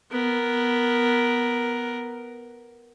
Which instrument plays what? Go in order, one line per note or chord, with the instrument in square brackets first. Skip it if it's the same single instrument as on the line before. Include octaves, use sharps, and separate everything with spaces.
[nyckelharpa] B3 A#4